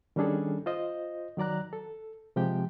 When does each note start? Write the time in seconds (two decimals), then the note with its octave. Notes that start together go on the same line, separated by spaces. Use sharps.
0.16 D#3 G3 C#4 D4 G#4 A4
0.66 F4 C5 D#5
1.37 D#3 F#3 D5 A#5 F#6
1.73 A4
2.36 C3 F3 G#3 G4 G5